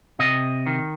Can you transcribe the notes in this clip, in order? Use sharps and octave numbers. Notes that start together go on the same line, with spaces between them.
C3 D#5
D#3